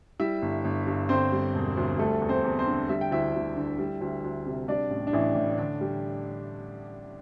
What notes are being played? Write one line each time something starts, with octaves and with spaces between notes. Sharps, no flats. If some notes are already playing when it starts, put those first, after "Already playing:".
G3 E4 E5
G1
G1
G2
D3 C4 C5
G3
E1
D2
G3 A3 A4
E2
C4 C5
E2
C4 C5
D3
G3 E5
G5
D2 E4 E5
D2
D3
G3
D2
D2
C3
G3 D4 D5
A1
D4
A1 E3 E4
A2
D3 D4
G3